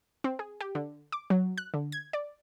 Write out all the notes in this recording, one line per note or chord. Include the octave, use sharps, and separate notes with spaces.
C4
G#4
G4
D3
D6
F#3
F#6
D3
G#6
D5